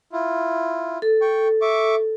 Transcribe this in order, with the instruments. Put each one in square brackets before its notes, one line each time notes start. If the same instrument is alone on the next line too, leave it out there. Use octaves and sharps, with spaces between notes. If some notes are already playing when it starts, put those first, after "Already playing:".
[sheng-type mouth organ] E4 F4
[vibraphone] A4
[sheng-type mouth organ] G5 C#6
E5 C#6 D6